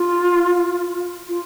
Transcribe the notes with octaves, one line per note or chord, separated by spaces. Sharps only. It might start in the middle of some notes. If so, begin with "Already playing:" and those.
Already playing: F4
F4